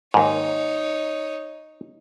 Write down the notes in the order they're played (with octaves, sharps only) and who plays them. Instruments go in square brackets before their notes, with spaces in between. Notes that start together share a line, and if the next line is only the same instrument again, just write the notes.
[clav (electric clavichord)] D#2 G#2 [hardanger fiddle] D#4 C#5